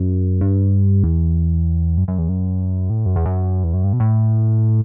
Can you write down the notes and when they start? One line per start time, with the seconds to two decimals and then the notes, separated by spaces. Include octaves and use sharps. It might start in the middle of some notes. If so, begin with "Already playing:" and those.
Already playing: F#2
0.41 G2
1.04 E2
1.98 F#2
2.08 F#2
2.18 E2
2.29 F#2
2.90 A2
3.06 F#2
3.16 E2
3.25 F#2
3.64 E2
3.74 F#2
3.84 G2
3.93 B2
4.00 A2